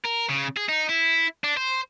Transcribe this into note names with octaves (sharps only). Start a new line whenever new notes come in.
A#4
C#3
G#4
D#4
E4
D4
C5